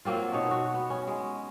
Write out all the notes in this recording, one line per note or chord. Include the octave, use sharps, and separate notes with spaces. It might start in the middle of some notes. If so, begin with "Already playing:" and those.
F#3 A#3 C4 F4
B2 D#4 C#5
F#4
B3
C#4
G#3